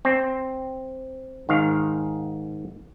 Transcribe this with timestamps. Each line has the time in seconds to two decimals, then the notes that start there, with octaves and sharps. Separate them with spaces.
0.05 C4
1.49 G#2 D#3 F5